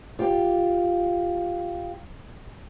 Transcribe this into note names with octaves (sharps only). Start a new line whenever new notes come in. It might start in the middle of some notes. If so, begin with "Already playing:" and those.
F4 G4